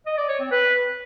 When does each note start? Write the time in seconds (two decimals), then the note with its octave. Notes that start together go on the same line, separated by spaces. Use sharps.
0.06 D#5
0.17 D5
0.29 C#5
0.40 C4
0.51 B4